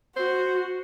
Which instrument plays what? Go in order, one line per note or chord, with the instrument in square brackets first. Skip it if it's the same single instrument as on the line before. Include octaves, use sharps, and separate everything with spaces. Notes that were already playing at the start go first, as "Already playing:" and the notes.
[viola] F#4 [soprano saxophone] C5